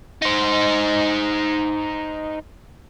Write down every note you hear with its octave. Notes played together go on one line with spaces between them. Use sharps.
D#4 C5